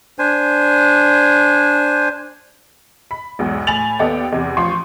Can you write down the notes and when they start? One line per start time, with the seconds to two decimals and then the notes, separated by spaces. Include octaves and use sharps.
0.19 D4 C5 G#5
3.11 B5
3.39 B1 E2 G#2
3.67 A2 G#5 B5 A6 F7 F#7
3.99 D#2 B3 A4 D5 D#5 G5
4.32 E2 C3
4.57 A1 F3 C6 C#6